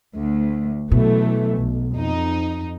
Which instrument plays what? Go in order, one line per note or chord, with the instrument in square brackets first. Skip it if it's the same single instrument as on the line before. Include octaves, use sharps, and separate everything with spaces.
[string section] D2
[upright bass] B2 [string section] E3 F#3 A3
[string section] B1
F2 D#4